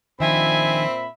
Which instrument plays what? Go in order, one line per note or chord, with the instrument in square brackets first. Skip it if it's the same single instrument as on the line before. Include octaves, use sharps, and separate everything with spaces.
[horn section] A#2 E5 B5 [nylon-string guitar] D#3 F3 D4 [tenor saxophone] C4 [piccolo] G#5